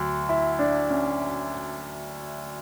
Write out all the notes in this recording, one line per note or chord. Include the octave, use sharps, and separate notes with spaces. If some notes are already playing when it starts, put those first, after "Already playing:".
Already playing: D2 F#3
E4
D4
C#4